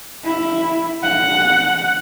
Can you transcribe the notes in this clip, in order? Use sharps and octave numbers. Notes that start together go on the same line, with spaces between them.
E4
F#5